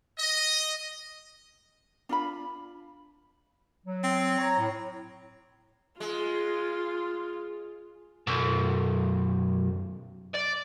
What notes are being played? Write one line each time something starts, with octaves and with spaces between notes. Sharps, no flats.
D#5
D4 F4 B5
F#3
C4
C#5 A#5
A2
G#3 F4
B1 F#2
D5